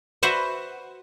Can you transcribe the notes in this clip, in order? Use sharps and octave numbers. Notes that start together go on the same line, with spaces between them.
F#4 B4 C5 E5 F#5